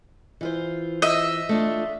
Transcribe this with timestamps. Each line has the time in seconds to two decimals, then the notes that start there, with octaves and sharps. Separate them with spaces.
0.41 E3 F4 C5
1.02 D#5 E5
1.49 A3 D4 F4